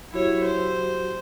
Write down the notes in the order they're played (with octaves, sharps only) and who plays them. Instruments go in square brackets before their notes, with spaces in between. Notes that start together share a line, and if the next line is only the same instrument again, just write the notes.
[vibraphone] F#3 F#4 G4 [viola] E4 C#5
[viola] C5